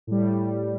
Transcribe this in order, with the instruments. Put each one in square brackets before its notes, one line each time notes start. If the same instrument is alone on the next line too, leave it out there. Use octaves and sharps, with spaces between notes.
[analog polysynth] A2 G3